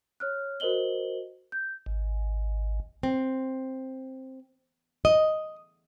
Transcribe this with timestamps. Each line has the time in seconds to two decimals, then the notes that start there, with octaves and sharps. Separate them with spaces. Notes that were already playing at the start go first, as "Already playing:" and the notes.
0.20 C#5 F6 F#6
0.60 F#4 A#4 C5 D#5 F#7 G7
1.52 G6
1.86 G#1
3.03 C4
5.05 D#5